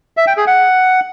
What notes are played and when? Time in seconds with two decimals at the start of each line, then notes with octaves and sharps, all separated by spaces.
0.17 E5
0.27 G5
0.37 G#4
0.47 F#5